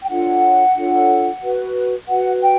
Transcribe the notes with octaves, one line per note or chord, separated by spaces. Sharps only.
G5
D4 F4 A4 C#5 F#5
D4 F4 A4 C#5
F#4 B4
F#4 B4 F#5
G5